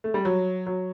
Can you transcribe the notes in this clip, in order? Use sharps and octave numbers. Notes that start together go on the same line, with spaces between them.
A3
G3
F#3
F#3